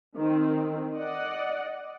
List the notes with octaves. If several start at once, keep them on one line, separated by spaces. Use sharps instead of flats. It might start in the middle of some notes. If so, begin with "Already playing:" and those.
D#3 C4
D5 D#5 F#5